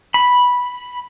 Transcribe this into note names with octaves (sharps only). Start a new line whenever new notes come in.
B5